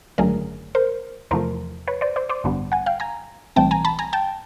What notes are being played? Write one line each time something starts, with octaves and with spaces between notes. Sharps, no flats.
G#1 F#2 D3 F#3 A3 G#4 A#4
A#4 C5
E2 C3 F3 A3 A#4 C5
B4 C#5
C5 D5
C5 D5
C5 D5
A1 G2 D3 G3 B3
F#5 G#5
F5 G5
G#5 A#5
B1 A2 E3 G3 C4 G5 A5
G#5 A#5
A5 B5
G#5 A#5
G5 A5